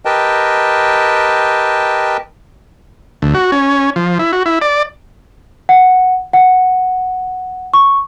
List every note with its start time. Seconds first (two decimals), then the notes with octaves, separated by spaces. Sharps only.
0.05 G4 A#4 B4 D#5 G5 A5
3.22 D2
3.34 F#4
3.52 C#4
3.96 F3
4.19 E4
4.33 F#4
4.46 E4
4.61 D5
5.69 F#5
6.33 F#5
7.74 C#6